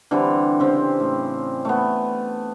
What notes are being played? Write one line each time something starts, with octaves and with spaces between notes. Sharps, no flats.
D3 E3 G3 C4
C#3 C4
A2
A3 B3